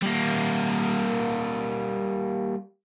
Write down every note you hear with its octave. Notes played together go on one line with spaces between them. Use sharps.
G3 A#3